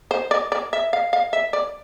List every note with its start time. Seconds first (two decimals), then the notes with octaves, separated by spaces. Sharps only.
0.11 C5
0.31 D5
0.52 D5
0.73 E5
0.93 F5
1.13 F5
1.33 E5
1.53 D5